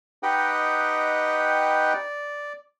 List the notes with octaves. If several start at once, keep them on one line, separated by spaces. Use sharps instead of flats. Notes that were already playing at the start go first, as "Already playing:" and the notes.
D#4 G4 B4 D#5 F#5 G5
D5